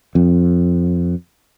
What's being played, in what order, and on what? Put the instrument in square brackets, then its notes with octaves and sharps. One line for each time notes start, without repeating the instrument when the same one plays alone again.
[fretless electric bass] F2